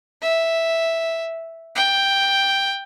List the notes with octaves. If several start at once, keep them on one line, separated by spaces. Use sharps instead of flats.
E5
G5